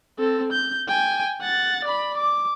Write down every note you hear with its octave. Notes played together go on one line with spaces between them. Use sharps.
C4 A4
G6
G5 G#5
F#5 A6
D5 B5
D6